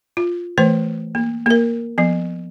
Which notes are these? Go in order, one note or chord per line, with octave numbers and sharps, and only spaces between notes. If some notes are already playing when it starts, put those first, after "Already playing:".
F4
E3 A3 B4 C5
A#3
A#3 A#4
F3 B3